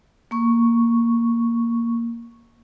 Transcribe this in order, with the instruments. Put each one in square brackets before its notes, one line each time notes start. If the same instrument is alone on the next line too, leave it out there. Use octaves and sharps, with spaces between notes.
[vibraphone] A#3 C#6